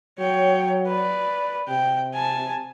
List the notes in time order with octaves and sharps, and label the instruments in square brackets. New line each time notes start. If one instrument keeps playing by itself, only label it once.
[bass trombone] F#3 [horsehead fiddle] C#5 G5
[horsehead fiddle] B4 D5
[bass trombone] C3 [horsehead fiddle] G5
[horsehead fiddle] G#5 A5